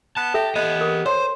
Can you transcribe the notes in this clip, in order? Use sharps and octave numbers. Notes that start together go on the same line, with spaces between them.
B3 A5
G4 A4 E5
B3 G4 D#5
A#4 D6
C5 C#5 C6